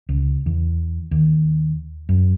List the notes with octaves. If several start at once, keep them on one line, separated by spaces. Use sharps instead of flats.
C#2
E2
D#2
F#2